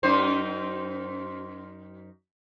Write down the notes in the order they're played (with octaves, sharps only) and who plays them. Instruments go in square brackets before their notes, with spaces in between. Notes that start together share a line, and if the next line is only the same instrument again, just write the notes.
[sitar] F#2 D#4 C5